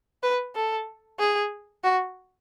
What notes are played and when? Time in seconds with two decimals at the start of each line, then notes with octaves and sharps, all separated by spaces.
0.23 B4
0.55 A4
1.19 G#4
1.84 F#4